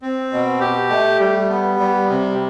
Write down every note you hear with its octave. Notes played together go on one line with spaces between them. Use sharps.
C4
B2
G4
A3
G3
B3
G3
C3